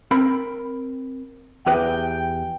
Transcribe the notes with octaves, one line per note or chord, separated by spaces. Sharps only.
C4 A#4 B5
E2 G4 B4 G5